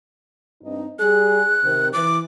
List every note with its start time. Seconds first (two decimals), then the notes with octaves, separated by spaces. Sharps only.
0.62 G2 C4 D#4
0.99 G3 G#4 F#6
1.63 C3 D#3
1.93 E3 D6